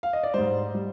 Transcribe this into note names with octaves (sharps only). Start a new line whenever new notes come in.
F5
D#5
D5
G#2 G3 C5
G3